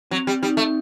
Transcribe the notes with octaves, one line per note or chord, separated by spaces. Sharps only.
F#3 C4
G3
G3 D#4
A3